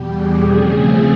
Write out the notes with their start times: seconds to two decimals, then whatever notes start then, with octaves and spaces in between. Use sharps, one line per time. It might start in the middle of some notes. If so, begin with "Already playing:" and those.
Already playing: E2 B2 G3 G4
0.14 G#4
0.44 C#3 F3 A3 C4
0.73 G#4